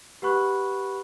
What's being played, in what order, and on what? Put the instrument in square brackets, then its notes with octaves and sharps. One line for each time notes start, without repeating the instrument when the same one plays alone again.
[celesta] G4 B4 F#5 B5 C#6 F#6